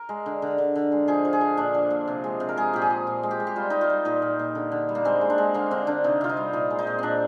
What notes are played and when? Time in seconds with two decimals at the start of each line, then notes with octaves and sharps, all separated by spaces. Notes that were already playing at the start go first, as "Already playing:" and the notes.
Already playing: A#4
0.09 G#3
0.26 D3
0.42 D3
0.58 D3
0.76 D3
0.92 G#3
1.08 F3 G#4
1.25 F3
1.33 G#4
1.41 F3
1.57 A#2 D4
1.74 F3
1.90 A#2
2.08 C3
2.24 G#3
2.40 C3
2.49 A#4
2.57 G#3 G#4
2.74 A#2 G4
2.82 G#4
2.90 F3
3.07 A#2
3.23 G#3
3.31 G4
3.40 G#3
3.47 G4
3.56 G3 F4
3.70 G3 D#4
3.81 F4
3.90 G3
4.05 A#2 D#4
4.22 A#2
4.39 A#2
4.55 D3
4.72 D3
4.89 G3
4.95 A#3
5.05 G#3 C4
5.21 G#3
5.30 D4
5.38 G#3
5.54 D3 A#3
5.71 D3 C4
5.87 D3 D4
6.04 C3 D#4
6.21 C3 F4
6.29 D#4
6.37 G3
6.53 A#2 D#4
6.71 G#3
6.79 D#4
6.87 A#2
6.99 A#2 C4 D4